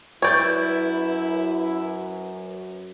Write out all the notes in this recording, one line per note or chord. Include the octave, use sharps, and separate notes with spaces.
F#2 E4 B4 C#5 D5 G6 G#6